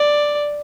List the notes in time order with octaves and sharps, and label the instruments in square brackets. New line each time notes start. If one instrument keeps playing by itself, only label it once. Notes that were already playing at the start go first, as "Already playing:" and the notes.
Already playing: [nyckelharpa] D5